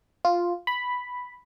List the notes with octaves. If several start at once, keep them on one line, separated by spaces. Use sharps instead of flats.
F4
B5